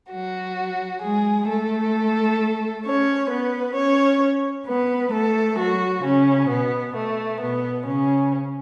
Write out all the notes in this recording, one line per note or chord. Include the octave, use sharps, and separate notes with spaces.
F#3 F#4
G#3 G#4
A3 A4
C#4 C#5
B3 B4
C#4 C#5
B3 B4
A3 A4
F#3 F#4
C#3 C#4
B2 B3
A3
B2 B3
C#3 C#4